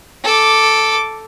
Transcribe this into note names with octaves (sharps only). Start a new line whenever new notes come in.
A4 D6